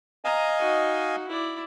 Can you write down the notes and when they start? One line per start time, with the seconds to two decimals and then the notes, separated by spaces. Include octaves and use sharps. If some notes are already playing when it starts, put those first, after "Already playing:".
0.25 D#5 F5 G#5 A#5
0.61 D#4 F#4
1.28 E4 D5